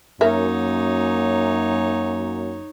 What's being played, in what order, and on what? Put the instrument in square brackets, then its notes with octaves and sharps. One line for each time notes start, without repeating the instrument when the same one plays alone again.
[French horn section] F#2 [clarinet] A#3 [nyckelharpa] D#4 C#5 [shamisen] A#4 E5